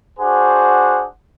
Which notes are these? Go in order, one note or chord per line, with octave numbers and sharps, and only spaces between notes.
D4 F#4 G#4 C5 F#5